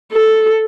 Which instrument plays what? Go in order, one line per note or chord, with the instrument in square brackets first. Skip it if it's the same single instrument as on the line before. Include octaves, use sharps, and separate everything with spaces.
[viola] A4